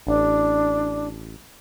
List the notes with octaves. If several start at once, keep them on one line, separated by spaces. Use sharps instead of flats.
A1 D4